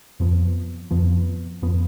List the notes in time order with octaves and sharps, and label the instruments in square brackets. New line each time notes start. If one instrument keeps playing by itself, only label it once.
[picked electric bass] F2 F3 B3
F2 F3 B3
F2 F3 B3